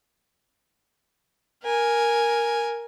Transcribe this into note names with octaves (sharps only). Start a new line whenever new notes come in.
A#4 G#5